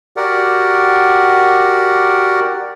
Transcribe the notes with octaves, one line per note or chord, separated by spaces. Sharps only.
F#4 G4 A#4 D5 F#5